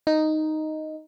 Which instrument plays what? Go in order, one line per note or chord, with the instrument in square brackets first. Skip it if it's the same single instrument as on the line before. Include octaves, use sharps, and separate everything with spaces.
[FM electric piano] D#4